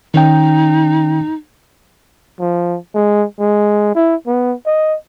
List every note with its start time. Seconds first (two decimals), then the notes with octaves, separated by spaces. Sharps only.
0.14 D#3 C#4 D#4 G5
2.40 F3
2.94 G#3
3.40 G#3
3.95 E4
4.27 B3
4.66 D#5